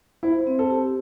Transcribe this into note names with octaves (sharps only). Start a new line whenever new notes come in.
E4 C5
C4
A4
G4